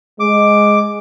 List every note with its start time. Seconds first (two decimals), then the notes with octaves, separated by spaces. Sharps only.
0.20 G#3 D6